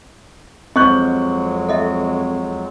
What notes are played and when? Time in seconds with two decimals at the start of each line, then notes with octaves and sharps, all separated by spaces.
0.76 F2 F#3 G#3 C4 D#5 C#6 F#6 G6
1.69 A4 D#5 E5